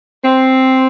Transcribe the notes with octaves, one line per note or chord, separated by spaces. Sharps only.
C4